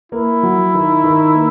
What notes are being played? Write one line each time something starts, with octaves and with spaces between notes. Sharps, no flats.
A#3 E4
F#3
D#3
D#3
A#3